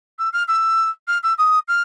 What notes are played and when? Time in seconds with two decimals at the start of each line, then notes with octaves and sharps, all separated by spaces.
0.19 E6
0.33 F6
0.48 E6
1.08 F6
1.23 E6
1.38 D#6
1.68 F6